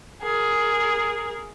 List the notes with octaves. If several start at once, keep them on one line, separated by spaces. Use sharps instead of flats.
G#4 A#4